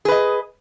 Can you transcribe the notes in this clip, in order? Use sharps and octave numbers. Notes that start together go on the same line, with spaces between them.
G#4 B4 D#5